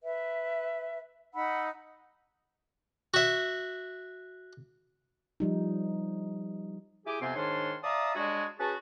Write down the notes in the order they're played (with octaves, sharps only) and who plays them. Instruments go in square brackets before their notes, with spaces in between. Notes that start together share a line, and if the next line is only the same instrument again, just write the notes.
[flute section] B4 E5
D#4 F#5 B5 E6
[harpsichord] F#4 E5
[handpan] F3 G3 D#4
[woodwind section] E4 G4 G#4 G#5 D6
F2 C3 B3 C4 G#5 C6
G#2 D#3 D4 C#5 C6
D5 E5 F5 A5 A#5 D#6
G3 G#3 D4 F#4 G#4 C#5
C#4 F#4 G#4 B4 A5